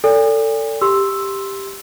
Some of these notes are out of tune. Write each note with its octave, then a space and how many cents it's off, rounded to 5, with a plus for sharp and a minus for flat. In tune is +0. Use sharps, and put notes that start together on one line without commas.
A4 +25 D5 -35 G#5 -40
G4 +5 C6 +0 E6 +0